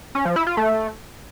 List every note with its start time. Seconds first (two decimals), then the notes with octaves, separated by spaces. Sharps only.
0.15 C#4
0.25 F3
0.36 E4
0.47 F4
0.57 A3